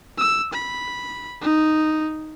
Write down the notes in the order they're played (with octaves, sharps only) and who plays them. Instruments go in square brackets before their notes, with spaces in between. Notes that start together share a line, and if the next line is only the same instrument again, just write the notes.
[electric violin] E6
B5
D#4